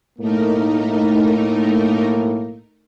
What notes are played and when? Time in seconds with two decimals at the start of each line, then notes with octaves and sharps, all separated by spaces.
0.19 B1 A2 A3 A#3 D#4 A#4